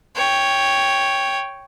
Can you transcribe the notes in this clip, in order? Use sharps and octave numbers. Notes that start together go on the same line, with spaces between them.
C#5 G5